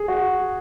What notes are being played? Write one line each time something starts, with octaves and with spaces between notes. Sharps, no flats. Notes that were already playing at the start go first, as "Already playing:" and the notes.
Already playing: G#4
F#4